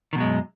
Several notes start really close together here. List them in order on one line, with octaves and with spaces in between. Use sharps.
D#3 B2 F#3 G#3 F#2